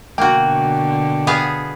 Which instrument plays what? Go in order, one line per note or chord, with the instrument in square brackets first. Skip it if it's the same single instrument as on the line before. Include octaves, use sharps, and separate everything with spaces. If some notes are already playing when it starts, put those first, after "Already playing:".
[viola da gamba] B2 D3 [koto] A#3 F#4 [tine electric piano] G5
[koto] B3 G#4 F5